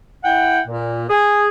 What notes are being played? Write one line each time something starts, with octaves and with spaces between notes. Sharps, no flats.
E4 F#5 G5
A#2
G#4